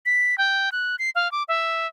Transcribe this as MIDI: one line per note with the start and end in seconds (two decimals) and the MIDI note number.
0.06 0.38 95
0.38 0.70 79
0.72 0.96 90
0.99 1.10 96
1.15 1.30 77
1.32 1.43 86
1.48 1.87 76